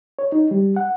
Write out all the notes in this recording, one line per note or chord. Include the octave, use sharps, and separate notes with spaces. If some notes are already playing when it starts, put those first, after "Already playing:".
C#5
D#4
G3
F#5